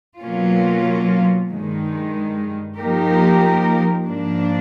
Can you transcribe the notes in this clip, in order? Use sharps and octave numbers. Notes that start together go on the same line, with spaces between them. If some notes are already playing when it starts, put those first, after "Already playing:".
B2 F#3 A#3 C#4 F4
G2 D#3 G#3
F3 A#3 D#4 G4 A#4
G#2 F3 A#3 D4